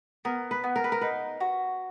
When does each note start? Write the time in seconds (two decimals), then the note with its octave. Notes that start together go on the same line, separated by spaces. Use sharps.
0.25 B3 A#4
0.51 B4
0.64 B3
0.76 A#4
0.84 B4
0.92 A#4
1.01 D#4 B4
1.41 F#4